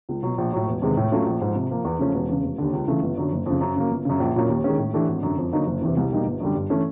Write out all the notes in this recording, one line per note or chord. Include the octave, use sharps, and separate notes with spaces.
C#2
B2 F#3
A#1
A2 F#3
E1
E2 C3 D#3 G#3
A2
F#3 A3 C#4 F4
A#1
G#2 F3
C3
F3 A#3
E2
C#3 F3 A3 C#4
E1
E2 C#3
F1
D#2 D3
C#2
C#3 E3 A3
G1
F#2 D3 F#3
F#1
F2 C#3
F#2
C#3 F#3 A#3
G1
F#2 C#3
A#1
A#2 F#3 A#3 C#4
D#2
D#3 G#3 C#4
A2
E3 A3 D4 G4
G#1
F#2 D3
F2
D3 F#3 A#3 D#4
F#1
E2 C3 E3
C2
B2 G3 A#3 D#4
G1
F#2 D3 G3
G2
E3 A3 C#4